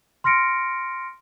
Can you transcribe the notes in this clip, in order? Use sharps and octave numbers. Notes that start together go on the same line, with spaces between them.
C6 F6 A#6 C#7 D7